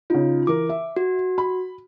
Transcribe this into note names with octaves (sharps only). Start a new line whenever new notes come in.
C#3 D#4 F4
E3 A#4 D6
E5
F#4
B5